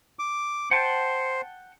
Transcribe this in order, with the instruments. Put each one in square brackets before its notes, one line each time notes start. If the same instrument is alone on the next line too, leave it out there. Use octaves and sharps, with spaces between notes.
[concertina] D6
[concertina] C5 [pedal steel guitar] F#5 G5 A5